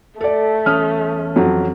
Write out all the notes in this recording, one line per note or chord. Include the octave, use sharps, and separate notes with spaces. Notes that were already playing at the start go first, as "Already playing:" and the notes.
A3 A4 D5
E2 C#4 D#6 F6
F2 F3 F#3